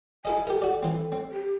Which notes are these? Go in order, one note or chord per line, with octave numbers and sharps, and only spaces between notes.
E4 A4 D#5 G#5
G4 A4 A#4
F#4 D5
E3 C4
C4
G4